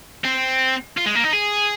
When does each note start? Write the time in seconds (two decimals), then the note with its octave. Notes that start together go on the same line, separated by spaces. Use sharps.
0.25 C4
0.97 F4
1.06 G#3
1.15 A#3
1.24 D#4
1.33 G#4